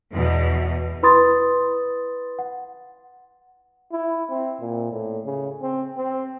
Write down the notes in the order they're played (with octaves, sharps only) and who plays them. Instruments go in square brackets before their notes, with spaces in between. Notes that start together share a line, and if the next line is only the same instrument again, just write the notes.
[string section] E2 B2
[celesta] E4 B4 B5 C6 D#6 A6
F#5
[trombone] E4
C4
A#2
A2
C#3
C4
C4